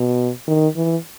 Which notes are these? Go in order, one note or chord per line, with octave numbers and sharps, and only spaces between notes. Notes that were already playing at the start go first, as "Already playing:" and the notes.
Already playing: B2
D#3
E3